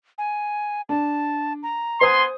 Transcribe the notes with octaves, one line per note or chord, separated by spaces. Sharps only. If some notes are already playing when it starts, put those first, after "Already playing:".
G#5
D4 A5
A#5
B3 C5 G#5 C6 D#6